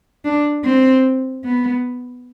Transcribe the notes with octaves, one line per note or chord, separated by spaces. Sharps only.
D4
C4
B3